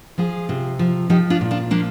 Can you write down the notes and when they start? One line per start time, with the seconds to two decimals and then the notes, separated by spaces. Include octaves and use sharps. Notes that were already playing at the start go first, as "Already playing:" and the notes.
0.18 F3 F4 G#4
0.49 C3
0.79 F3
1.10 F3 D#4 G4
1.30 D4 F4
1.41 A#2
1.51 D4 F4
1.71 F3 A#3 D4